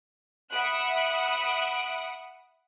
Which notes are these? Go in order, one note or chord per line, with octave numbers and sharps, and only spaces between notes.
E5 F#5 B5 D#6 F#6 D7